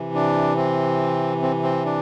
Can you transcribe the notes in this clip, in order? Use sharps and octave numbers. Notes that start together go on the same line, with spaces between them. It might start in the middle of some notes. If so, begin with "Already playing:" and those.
Already playing: C3 E3
D4
C4
C4
C4
D4